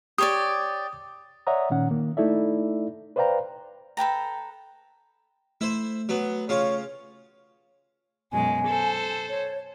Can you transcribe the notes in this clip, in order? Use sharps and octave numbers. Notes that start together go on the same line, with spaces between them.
G4 C#5 D5 D#6
C#5 D5 E5 F#5 A#5 D#6
A#2 D#3 C#4 F#5
D#3 A#3
A3 D#4 E4 A4 D5 E5
B4 C5 D5 F5 G5 A#5
A4 B4 G5 A#5
A3 E4 C5
F#3 B3
C#3 F4 C#5
F#2 B2 G#3 G#5
A4 C5
C#5